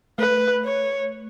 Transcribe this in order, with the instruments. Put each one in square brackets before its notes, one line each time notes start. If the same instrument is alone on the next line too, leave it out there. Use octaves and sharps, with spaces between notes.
[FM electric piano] A3 [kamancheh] B4
[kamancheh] C#5